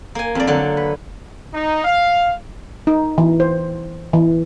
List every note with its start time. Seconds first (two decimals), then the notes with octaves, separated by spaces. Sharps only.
0.15 A#3 G#5
0.35 F2 D5
0.47 D3 F#3 D5
0.77 B4
1.54 D#4
1.85 F5
2.87 D#4
3.18 E3
3.40 C5
4.13 E3